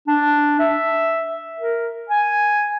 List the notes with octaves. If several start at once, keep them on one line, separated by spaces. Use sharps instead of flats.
D4
E5
A#4
G#5